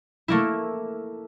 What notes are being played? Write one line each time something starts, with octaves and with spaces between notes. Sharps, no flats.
A3 A#3 E4